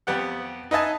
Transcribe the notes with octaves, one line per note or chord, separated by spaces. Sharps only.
F2 B3 G4 F#5
D#4 B4 D#5 E5 G#5 A5